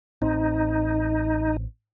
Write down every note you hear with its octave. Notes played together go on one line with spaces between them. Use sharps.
A1 C4 D#4